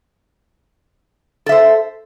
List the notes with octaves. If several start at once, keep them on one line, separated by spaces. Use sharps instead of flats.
A4 C5 E5